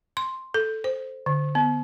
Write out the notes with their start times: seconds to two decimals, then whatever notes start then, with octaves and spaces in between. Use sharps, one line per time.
0.17 C6
0.54 A4
0.84 C5
1.26 D3
1.55 B3